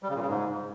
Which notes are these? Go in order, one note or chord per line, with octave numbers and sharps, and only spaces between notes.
G3
C#3
A#2
C#3
G#2